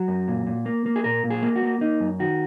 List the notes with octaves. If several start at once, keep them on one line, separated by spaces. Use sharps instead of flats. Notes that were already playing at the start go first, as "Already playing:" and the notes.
Already playing: F#3 F#4
F#2
A#2
A#2
A#3
A#3
G#4
A#2 A#4
A#2
G#4
A#3
F#4
A#3
A#3 D#4
F#2
D#3 F#4